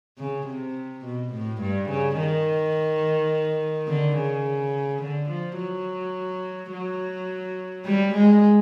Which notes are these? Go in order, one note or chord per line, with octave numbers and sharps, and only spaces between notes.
C#3
C3
B2
A2
G2
C#3
D#3
D3
C#3
D3
F3
F#3
F#3
G3
G#3